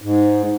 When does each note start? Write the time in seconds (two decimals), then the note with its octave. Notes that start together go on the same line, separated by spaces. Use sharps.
0.02 G#2